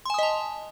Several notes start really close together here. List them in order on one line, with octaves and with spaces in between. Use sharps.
C6 G#5 D#6 D#5 A5